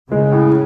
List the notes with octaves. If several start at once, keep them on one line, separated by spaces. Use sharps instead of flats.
C#3 G#3
A2